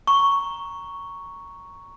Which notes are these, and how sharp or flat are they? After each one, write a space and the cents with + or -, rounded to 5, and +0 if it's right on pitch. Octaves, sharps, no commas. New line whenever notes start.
A#5 +0 C#6 +0